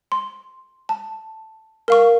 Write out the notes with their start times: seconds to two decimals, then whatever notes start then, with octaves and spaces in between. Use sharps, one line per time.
0.12 C6
0.89 A5
1.88 A#4 F5 C#6